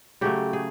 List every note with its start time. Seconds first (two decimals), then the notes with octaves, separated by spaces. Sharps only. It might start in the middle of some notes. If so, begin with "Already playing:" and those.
0.21 C#3 F#3 A3 G4
0.53 G#4